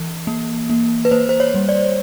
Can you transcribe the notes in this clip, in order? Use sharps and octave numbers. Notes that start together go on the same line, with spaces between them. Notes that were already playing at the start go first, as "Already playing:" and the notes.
Already playing: E3
A#3
A#3
B4
A#3 C5
C5
C#5
G3
D5